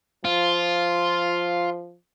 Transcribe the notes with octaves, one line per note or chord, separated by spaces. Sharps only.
F3 F4